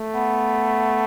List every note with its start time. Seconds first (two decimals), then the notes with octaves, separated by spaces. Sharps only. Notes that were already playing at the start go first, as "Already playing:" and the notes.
Already playing: A3
0.14 B3